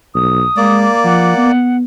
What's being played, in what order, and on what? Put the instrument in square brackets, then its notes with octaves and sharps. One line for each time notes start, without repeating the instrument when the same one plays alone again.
[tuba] B1 [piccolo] D#6
[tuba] G#3 [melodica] A#3 D5
[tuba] F3 [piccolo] F#5
[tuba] B3